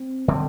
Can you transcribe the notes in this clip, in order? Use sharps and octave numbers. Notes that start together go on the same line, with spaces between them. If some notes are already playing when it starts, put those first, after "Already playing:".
Already playing: C4
D3 G3 C4